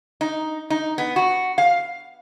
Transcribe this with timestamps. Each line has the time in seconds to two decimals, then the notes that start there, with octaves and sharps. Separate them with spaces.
0.21 D#4
0.70 D#4
0.98 B3
1.16 F#4
1.58 F5